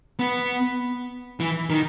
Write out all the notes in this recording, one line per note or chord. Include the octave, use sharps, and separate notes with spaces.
B3
E3
D#3